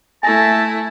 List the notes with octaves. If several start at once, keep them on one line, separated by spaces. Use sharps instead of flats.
A3 E4 G#5 A5 A#6